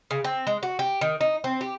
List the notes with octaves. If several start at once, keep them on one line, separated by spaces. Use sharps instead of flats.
C#3
C4
G#3
F#4
G4
D#3
D#4
C4
G4